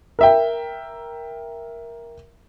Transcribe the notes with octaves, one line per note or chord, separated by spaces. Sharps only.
A#4 E5 G5